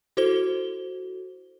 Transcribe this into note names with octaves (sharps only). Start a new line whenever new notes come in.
E4 F#4 A4 C5 G7